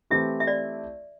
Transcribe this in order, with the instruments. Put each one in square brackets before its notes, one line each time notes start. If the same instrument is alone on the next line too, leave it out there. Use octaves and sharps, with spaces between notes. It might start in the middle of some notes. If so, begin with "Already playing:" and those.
[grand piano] E3 A3 C4 E4 G4 [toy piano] E5
[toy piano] E5
D5